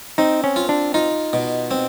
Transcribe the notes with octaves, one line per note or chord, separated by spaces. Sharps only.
C4 D#4
C#4
F4
D4
D#4 F4
B2
C4